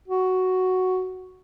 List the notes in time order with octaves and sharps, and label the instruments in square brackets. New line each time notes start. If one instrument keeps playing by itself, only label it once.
[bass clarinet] F#4